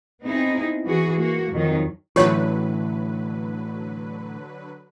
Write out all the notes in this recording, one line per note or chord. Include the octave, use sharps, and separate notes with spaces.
B3 C4 D#4 E4 G#4
E3 F#4 G#4
A#3 F#4
F2 D#3 F#3
A2 D3 E3 F#3 G4 B4 C#5